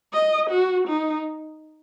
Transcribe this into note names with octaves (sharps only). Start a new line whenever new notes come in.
D#5
F#4
D#4